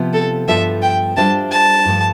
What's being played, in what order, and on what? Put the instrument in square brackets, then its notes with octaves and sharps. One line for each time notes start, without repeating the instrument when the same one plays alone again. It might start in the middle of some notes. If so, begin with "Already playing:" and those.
Already playing: [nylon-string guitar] C3 F3 B3
[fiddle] A4
[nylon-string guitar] G2 F3 B3 F4 A4 [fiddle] E5
[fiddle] G5
[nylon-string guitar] G3 D4 F4 C5 E5 [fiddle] A5
[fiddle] A5
[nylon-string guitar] G2 F3 A3